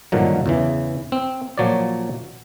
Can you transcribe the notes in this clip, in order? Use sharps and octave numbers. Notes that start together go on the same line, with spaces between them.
G2 A#2 D3 D#3 F3 F#3
E2 C#3 E3
C4
A#2 F3 F#3 C#5 D5